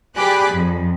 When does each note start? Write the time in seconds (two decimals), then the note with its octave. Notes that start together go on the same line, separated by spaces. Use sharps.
0.16 G4 G#4 D5 B5 F#6
0.53 F2